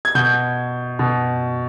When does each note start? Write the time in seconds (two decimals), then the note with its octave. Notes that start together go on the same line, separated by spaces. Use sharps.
0.05 G#6
0.15 B2 G6
0.99 B2